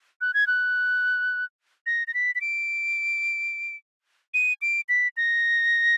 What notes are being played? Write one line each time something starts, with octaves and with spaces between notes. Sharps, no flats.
F#6
G#6
F#6
A#6
A#6
B6
B6
D7
D#7
D7
B6
A#6